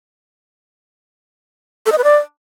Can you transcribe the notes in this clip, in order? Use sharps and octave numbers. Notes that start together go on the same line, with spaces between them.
A4
D#5
B4
D5